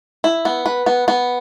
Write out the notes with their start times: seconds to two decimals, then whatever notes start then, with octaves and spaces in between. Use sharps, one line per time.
0.24 E4
0.45 B3
0.66 B4
0.86 B3
1.08 B3